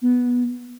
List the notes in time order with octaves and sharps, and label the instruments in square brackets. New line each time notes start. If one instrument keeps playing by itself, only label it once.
[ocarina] B3